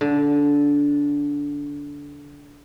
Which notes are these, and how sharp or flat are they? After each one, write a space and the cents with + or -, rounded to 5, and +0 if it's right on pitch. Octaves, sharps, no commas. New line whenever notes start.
D3 -20